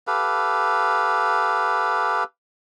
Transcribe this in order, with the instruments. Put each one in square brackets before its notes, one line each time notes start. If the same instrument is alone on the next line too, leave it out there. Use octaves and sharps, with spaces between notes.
[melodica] G4 A4 B4 F5